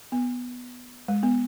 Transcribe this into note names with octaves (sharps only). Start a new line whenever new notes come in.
B3
G#3
B3